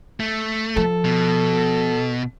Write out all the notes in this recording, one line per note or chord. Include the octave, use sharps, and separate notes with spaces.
A3
F3 A4
B2